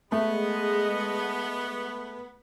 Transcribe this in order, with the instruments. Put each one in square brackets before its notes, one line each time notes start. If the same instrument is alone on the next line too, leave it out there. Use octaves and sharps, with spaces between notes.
[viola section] G#3 D#5 [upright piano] A3 [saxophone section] B3